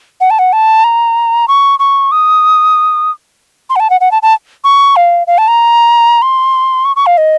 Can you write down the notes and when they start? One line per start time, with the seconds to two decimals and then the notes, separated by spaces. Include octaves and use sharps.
0.21 F#5
0.30 A5
0.39 F#5
0.53 A5
0.84 A#5
1.48 C#6
1.79 C#6
2.12 D#6
3.70 C6
3.76 F#5
3.80 A5
3.90 F#5
4.01 F#5
4.11 A5
4.22 A5
4.64 C#6
4.96 F5
5.27 F5
5.38 A5
5.48 A#5
6.22 C6
6.85 C#6
6.96 C#6
7.06 F5
7.18 D#5